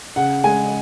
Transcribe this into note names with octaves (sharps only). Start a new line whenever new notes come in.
C#3 F#5
G#3 G#5